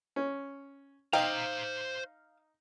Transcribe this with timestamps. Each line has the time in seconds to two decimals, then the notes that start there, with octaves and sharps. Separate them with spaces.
0.16 C#4
1.13 D#4 C5 F5 G5 A#5